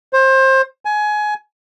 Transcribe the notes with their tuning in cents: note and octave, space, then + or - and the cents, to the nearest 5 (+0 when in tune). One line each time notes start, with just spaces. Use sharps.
C5 +25
G#5 +20